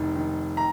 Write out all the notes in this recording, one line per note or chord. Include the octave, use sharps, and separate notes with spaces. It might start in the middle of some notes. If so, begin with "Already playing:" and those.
Already playing: F1 D#3
D#3
A#5